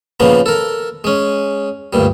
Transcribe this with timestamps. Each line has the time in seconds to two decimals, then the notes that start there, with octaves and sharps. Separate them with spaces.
0.20 A#2 C#3 F3 A#3 B3
0.46 A4 A#4
1.04 G#3 C#4
1.93 D2 G2 A#2 G3